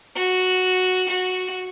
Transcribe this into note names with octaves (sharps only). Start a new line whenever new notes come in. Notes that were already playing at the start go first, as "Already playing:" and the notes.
F#4
F#4